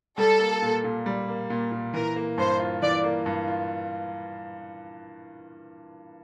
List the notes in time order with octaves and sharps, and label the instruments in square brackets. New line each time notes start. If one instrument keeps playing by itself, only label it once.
[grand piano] G3 [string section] A4
[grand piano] A#3
A#2
A#2
G3
A#3
A#2
A#2
[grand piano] E3 [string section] A#4
[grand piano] A#3
[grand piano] G2 [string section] C5
[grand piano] F4
[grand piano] E3 [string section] D5
[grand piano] A#3
G2
F4